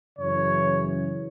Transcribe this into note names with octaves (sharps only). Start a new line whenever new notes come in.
F#2 C#3 E3 C#5